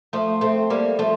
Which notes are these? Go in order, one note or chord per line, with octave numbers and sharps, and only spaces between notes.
F3 A3
A3 C4
G3 A#3
F3 A3